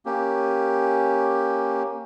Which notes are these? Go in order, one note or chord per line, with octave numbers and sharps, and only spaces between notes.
A#3 C#4 G4